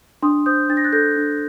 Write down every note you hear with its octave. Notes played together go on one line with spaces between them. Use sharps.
D4 C6 D#6
C5 D#6 G6
D4 A6
A#6
F#6 A6
A4 G6 A#6
D4